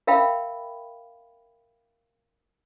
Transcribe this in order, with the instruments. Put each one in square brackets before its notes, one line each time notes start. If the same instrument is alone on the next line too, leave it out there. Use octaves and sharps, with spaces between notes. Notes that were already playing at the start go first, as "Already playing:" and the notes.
[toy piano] A#4 E5 F5 G5 B5